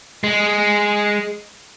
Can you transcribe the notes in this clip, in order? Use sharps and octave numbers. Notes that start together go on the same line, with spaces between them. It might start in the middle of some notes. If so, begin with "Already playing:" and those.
G#3